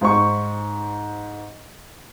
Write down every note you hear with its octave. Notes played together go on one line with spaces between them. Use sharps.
G#2 C5 C#6